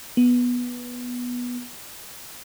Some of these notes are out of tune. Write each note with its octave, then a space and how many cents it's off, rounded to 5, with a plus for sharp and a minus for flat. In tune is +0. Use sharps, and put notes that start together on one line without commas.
B3 -10